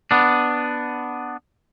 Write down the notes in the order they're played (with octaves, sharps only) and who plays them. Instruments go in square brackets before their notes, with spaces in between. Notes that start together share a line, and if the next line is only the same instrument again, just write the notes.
[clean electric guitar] B3 D4